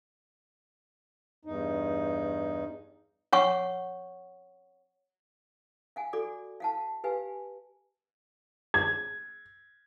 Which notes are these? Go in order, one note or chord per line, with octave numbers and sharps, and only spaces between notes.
E2 G2 D#4
C#5 F#5 C#6
F5 F#5 G#5
F#4 A4 D5 D6
F5 F#5 A5
G4 B4 F5 G#5
G#6